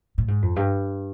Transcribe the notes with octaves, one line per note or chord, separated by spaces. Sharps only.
A2
G#2
F2
G2